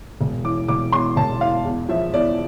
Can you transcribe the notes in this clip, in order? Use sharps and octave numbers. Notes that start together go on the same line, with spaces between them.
E1
E3 D6
E1 D6
E2 C6
E1 A5
E3 F5
E2
F3 E5
E2 D5